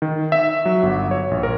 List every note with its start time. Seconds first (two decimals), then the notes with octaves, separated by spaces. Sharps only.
0.02 D#3
0.32 E5
0.65 F#3
0.83 G1
1.11 C#5
1.31 A#1
1.43 A#4